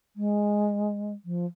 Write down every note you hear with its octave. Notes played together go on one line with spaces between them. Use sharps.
G#3
F3